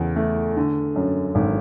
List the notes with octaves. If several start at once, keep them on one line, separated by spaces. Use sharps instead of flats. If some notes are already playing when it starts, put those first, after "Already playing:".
Already playing: E2 C#3
A3
D3
F#2
G#1